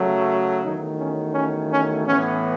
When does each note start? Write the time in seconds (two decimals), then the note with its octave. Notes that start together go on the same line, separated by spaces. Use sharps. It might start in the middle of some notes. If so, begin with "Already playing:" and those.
Already playing: C#3 F#3 A3
0.64 E2 D#3 F#3 A3 D#4
0.99 C#4
1.34 C#4
1.70 C#4
2.06 A2 E3 B3 C#4